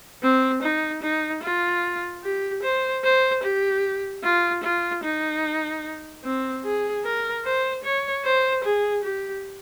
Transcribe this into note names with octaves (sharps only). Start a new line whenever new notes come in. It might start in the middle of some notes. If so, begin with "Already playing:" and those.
C4
D#4
D#4
F4
G4
C5
C5
G4
F4
F4
D#4
C4
G#4
A#4
C5
C#5
C5
G#4
G4